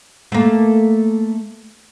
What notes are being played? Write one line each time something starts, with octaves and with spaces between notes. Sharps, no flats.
A3 A#3